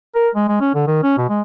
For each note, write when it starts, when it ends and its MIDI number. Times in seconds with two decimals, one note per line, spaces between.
0.15 0.29 70
0.35 0.47 56
0.48 0.60 56
0.60 0.74 61
0.75 0.84 50
0.87 1.01 51
1.03 1.16 61
1.18 1.25 47
1.29 1.41 56